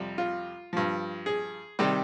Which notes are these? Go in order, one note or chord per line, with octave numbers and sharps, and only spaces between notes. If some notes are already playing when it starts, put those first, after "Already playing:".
Already playing: F2 C3 G3
F4
G2 F3
G#4
C3 D#3 G3 G4